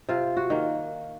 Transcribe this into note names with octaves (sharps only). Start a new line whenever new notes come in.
C3 F4
F#4
D#3 A#3